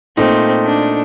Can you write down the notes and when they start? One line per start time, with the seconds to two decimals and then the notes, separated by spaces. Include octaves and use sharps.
0.17 A#2 A3 C4 D#4
0.65 D4